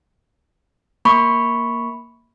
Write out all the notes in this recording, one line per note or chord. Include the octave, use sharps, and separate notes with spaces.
A#3 B5 C#6